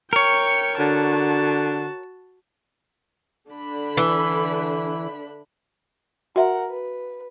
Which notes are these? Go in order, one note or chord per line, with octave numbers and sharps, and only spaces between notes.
A#4 C#5 G5 C#7
D3 F#4 A5
D3 D4 B5
E3
F#4 A#4 E5 F#5
B4